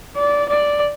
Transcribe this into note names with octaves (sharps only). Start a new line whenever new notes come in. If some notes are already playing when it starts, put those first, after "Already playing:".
D5
D5